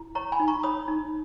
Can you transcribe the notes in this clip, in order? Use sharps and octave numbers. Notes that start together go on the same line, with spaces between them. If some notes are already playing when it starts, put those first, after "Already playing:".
Already playing: E4
C#5 A#5 C#6
G#5 B5
D#4
A#5 C#6
C#5 B5 D#6
D#4